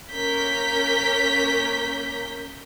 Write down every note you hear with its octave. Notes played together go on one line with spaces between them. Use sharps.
A#3 C#4 A#4 G6 B6